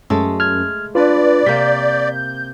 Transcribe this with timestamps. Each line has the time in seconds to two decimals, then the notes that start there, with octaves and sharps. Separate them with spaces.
0.10 F#2 G#3 A3 A4
0.40 F6 G#6
0.95 D4 F4 B4 D5
1.46 C3 A#3 G6 B6